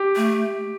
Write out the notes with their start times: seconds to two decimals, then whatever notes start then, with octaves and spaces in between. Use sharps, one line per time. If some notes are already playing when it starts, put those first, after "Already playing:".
Already playing: G4
0.16 A3